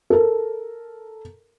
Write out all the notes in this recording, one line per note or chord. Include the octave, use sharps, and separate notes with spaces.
A4 A#4